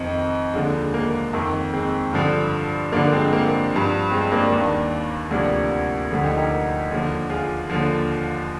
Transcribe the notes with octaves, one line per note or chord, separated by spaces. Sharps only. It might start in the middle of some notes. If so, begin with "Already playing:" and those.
Already playing: F2 D#3 C4 D#4
D#2 D3 F3 G#3
G#3
A#3
F2 D#3
G#3 C4
G2 D3 F3
G2 D3 F3 A#3 D4
G#3 C4
A#3
G2 F3
G#3 C4
A#3 D4
D#2 D#3
D2 C3 F3 A#3 D4
D2 D3 F3
D#4 G4
G4 A#4
D#2 D3 F3
F4 G#4
D#2 D3 F3